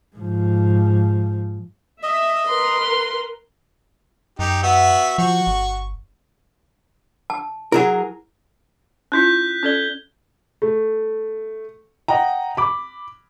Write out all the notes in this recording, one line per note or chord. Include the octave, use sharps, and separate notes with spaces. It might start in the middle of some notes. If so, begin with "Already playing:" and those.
G#2 F3
D#5 E5
A#4 B4 C6
F#2 D#4 G4
B3 F#4 E5
F3 F#4 C#6
G1
A5
F#3 E4 G#4 A#4
C#4 E4 F4 F#6 G6 B6
C#4 A4 D5 G6 G#6 G7
A3
D#5 F#5 G5 A#5
B5 D6